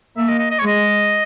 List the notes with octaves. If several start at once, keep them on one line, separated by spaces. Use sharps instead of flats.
A#3 E5
D#5
D#5
D#5
G#3 C#5
D#5